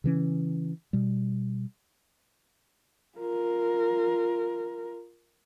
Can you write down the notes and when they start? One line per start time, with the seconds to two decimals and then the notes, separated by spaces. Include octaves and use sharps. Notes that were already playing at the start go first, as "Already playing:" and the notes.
0.04 C#3 E3 C#4
0.93 B2 G3
3.18 F4 A#4